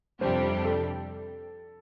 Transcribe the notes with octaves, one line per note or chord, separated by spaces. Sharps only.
F2 C3 G3 D4 G4 C5
A4